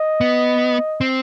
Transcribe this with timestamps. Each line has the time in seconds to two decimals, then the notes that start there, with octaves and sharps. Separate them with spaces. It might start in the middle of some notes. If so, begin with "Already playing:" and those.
Already playing: D#5
0.21 B3
1.01 C4